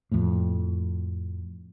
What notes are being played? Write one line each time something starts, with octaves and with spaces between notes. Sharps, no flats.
F2 A2